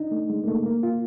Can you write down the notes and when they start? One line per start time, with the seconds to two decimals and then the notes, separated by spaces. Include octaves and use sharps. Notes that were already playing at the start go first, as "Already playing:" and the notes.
Already playing: D4 D#4
0.11 A3
0.30 G#3
0.44 A#3
0.48 A3
0.66 A#3
0.83 F4